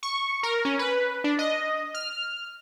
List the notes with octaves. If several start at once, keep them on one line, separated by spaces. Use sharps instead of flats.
C#6
A#4
C#4
B4
D4
D#5
F6